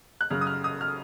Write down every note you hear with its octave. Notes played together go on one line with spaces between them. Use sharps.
F#6
F#2 C#3 F6
D#6
F6
D#6
F6